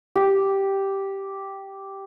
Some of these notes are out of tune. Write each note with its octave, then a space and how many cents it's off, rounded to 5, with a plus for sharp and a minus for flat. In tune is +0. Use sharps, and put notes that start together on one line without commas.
G4 -5